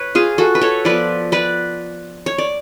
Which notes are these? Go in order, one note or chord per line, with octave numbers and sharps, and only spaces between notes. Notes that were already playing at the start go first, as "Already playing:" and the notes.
Already playing: B4 C#5
F4 G#4
F#4 A4
B4
A4 C#5
F3 B3 B4 D5
B4 D5
C#5
D5